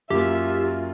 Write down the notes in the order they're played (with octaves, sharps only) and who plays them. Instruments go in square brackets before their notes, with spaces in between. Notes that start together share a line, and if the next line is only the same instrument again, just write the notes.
[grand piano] F#2 A#3 [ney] F4 [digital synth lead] G4 [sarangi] E5